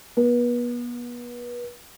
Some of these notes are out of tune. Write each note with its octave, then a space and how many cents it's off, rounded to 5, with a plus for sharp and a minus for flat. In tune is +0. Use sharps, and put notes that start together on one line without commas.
B3 -35